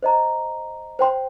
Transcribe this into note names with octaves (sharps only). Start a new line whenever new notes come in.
C5 D#5 A#5
C5 G5 C6